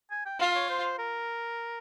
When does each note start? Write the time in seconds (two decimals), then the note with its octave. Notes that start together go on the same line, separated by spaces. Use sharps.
0.11 G#5
0.26 G5
0.40 F4 F5
0.55 C#5
0.70 C5
0.99 A#4